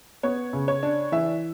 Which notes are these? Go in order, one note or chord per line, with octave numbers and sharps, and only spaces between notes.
B3 C#5
C#3
C#5
D4
E3 E5